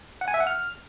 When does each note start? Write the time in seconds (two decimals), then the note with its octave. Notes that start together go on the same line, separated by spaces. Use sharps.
0.21 F#5
0.28 G#5
0.34 E5
0.40 F#5
0.47 F6